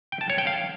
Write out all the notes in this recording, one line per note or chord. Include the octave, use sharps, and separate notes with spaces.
G5
A5
C#5
G5
F5